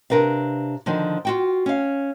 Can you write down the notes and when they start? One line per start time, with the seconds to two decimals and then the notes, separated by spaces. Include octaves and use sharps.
0.10 C3 D4 A#4 B4 F5
0.86 D3 D#3 F3 D#4
1.25 F4 F#4 G5
1.66 C#4 F5